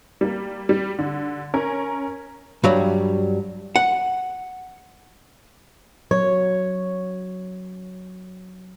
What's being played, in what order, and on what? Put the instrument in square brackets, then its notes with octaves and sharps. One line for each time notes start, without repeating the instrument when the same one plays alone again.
[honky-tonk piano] G3 A#3
G3
D3
C#4 A#4
[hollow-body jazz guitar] G2 F#3 G3
F#5
[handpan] F#3 [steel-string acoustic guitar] C#5